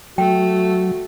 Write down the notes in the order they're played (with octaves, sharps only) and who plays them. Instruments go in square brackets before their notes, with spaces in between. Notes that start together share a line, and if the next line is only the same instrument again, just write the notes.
[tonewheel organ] F#3 [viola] A3 [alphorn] F#4 [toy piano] G5